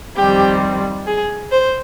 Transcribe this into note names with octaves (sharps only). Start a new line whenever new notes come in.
F2 D#3 G3 C4 G4
G#4
C5